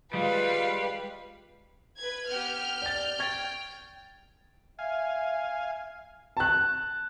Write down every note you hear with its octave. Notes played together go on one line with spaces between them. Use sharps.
G3 G#3 F4 B4 F5
B4 G#6
B3 G4 F6 G6
D5 A6
G5 C#6 G#6 A6
E5 F5 G#5
A5 F#6